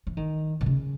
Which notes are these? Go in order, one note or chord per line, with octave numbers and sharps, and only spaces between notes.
E3
D#3
B2
C#3